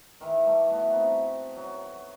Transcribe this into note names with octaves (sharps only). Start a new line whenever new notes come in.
D#3 E3 E4
G3 A3
E3 A3 B3 F#4
C4 D#4 B4
F#3